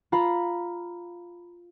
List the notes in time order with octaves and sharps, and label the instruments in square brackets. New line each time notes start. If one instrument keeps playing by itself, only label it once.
[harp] F4 F5 A#5 B5